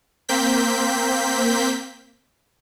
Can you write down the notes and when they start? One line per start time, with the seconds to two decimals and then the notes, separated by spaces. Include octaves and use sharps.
0.29 A#3 C4 G6 B6